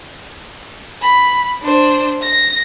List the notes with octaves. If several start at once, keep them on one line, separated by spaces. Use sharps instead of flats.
B5
D4 C5
A#6